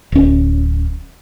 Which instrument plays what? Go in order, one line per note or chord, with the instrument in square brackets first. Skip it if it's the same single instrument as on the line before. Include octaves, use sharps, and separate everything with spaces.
[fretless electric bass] D1 C#4